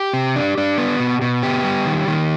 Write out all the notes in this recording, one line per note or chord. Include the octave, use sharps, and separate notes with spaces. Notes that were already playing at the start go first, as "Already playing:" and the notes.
Already playing: G4
C3
D4
D4
B3
B2
B2
B3 G4
G3
D#3
D#3